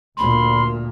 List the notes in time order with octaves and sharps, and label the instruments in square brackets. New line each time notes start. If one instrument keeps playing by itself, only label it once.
[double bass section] D2 A#2 [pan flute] B5 [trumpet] C6